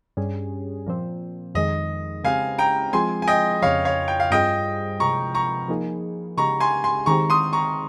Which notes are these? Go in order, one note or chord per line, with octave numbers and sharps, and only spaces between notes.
G2 G3 C#4 G#4
A#2 F3 C4
F2 D#3 G#3 D#5
C#3 G#3 C4 G4 F5 G#5
G5 A#5
F3 G#3 C4 F4 G#4 G#5 C6
G#5
D#5 G5
F2 C#3 F3 C#5 F5
C#5 F5
G5
F5
G2 G3 C4 F4 G#4 D#5 G5
C3 F3 G#3 A#5 C#6
A#5 C#6
F3 A#3 D#4 G#4
C#3 G#3 D#4 G4 A#5 C#6
G#5 C6
G#5 C6
D#3 G#3 C4 G4 A#5 C#6
C6 D#6
A#5 C#6